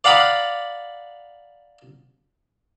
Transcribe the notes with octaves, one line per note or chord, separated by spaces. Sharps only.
D5 F5 F#5 A#5 B5 D#6